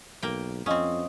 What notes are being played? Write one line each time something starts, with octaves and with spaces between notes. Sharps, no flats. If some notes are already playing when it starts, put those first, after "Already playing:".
B1 A#3 G5
F2 C4 C#4 D#5 F5 D#6